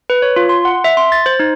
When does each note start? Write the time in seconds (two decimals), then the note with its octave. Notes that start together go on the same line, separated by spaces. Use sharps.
0.10 B4
0.22 C#5
0.36 F4
0.49 C6
0.65 F#5
0.84 E5
0.97 C6
1.12 A6
1.26 C5
1.40 D#4